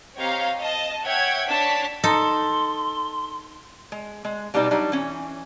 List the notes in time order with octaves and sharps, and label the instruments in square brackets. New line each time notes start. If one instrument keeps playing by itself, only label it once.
[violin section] C4 G4 C#5 D#5 F5 A#5
D#5 A5
C#5 E5 F#5 G5 G#6
D4 C#5 A5 B6
[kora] D#4 [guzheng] A4 [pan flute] C6
[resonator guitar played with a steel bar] G#3
G#3
B2 G3 B3 D#4 D5
F#3 G3 D4 D#4
E3 C#4